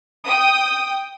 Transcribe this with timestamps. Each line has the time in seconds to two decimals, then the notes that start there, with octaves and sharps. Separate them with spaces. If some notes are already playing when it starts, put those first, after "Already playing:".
0.25 G5 D#6